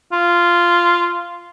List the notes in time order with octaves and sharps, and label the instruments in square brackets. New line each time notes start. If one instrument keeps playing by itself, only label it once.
[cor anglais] F4